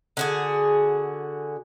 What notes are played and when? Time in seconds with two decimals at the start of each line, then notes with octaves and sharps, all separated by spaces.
0.17 D3 F#4 G#4